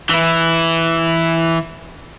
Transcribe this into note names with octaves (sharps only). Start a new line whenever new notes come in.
E3 E4